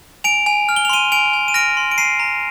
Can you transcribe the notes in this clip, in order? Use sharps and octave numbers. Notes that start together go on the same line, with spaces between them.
G#5 D7 F7
G#5
F6
G7
F7
C6 D#7 G7
G#5 D7 F7
G#5
D#7
F6 A#6 D7
C6
D7
A#5 C7 D#7
A#5